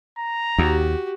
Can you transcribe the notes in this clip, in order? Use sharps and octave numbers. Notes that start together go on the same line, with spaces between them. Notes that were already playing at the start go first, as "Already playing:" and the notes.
A#5
D#2 F#4 G4